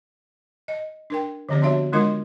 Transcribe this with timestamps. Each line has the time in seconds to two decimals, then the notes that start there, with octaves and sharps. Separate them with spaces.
0.68 D#5
1.10 D4 A#4 G5
1.49 D3 F3 C4 G4 D5
1.62 B3 D4 F#4 C#5 E5
1.92 D#3 G#3 D4 F4 A#4 D#5